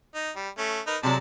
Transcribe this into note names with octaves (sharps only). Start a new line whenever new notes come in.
D#4
G3
A3 C#4
D#4 A#4 B4
C3 F#3 G#3 D5 A5